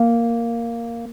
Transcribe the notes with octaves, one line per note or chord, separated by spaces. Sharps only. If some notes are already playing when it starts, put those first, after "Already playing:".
Already playing: A#3